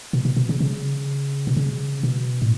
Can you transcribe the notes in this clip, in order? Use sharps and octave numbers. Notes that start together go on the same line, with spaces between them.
B2
B2
B2
C#3
C#3
B2
C#3
B2
A2